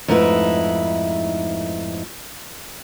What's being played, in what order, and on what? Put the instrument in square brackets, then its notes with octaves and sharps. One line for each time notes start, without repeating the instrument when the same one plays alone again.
[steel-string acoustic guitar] F2 G#2 A3 D#4 E4 B4